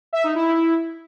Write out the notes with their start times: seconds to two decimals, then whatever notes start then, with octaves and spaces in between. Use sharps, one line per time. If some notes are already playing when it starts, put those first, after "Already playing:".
0.13 E5
0.24 D#4
0.35 E4